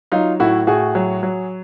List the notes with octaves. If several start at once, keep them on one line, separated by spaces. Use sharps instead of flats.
F#3 D#4 F4
A2 E4 F#4
A2 F#4 G#4
F#3
F#3